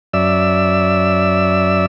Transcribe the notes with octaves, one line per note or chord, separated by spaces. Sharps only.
F#2 D5 E5 E6